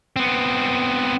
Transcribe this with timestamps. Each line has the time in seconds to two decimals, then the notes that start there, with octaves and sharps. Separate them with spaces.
0.16 B3 C4